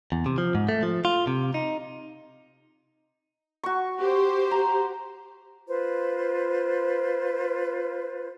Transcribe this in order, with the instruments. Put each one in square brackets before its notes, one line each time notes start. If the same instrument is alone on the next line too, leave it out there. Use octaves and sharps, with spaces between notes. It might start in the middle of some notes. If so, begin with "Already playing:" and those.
[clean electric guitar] E2
C3
F3
G#2
A3
F3
F4
C3
D#4
[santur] F#4 C#6
[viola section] G4 C5
[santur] A#5
[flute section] F4 B4 C5